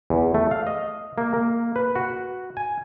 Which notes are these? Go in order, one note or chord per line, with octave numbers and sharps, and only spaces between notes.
E2
A3
F5
D#5
A#3
A#3
B4
F#4
G#5